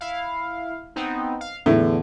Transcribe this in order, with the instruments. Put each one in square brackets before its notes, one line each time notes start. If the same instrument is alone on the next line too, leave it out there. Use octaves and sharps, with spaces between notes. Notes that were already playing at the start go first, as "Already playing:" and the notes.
[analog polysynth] E4 F5
B3 C4 D#4
F5
[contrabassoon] E2 [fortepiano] A2 [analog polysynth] D3